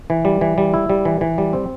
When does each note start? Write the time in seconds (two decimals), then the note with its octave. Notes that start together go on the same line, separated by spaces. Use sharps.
0.10 E3
0.25 G3
0.41 E3
0.58 G3
0.74 E4
0.90 G3
1.05 E3
1.21 E3
1.38 G3
1.53 C4